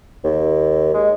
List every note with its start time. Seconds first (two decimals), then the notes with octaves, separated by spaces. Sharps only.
0.24 D#2
0.94 G#3